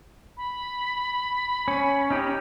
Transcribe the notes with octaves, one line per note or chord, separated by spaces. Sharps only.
B5
C#4
C#4 D#4 G4